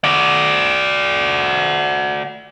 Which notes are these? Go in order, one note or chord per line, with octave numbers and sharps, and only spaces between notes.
F#4 D5